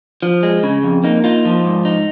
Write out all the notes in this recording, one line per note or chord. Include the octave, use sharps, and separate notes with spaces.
F3
G#3
C#3
F2
A#3 D#4
D#4 F4
F3
G#2
D#4